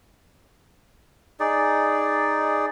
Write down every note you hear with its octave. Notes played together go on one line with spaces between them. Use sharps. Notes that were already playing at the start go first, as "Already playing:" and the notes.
D#4 G#4 D5